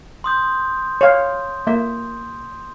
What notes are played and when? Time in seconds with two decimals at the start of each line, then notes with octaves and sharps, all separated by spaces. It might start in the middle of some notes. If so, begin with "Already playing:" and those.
0.24 C6 D#6 G6
1.01 C#5 F5
1.67 A#3 E5